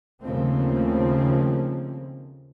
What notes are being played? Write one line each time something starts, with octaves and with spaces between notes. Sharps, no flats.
D#2 C#3 F3 A3 A#3 C4